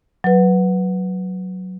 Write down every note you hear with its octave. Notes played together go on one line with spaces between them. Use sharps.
F#3 B4